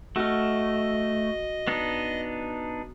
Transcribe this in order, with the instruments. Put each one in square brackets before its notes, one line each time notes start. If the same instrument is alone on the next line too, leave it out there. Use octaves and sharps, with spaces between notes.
[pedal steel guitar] A3 [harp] F#4 F6 [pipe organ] D#5
[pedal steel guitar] B3 D4 D#4